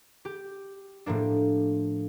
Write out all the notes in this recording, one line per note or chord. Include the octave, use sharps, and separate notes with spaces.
G4
A2 F3 A#3 D4